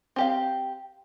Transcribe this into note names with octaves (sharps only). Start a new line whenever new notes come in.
C4 G4 F5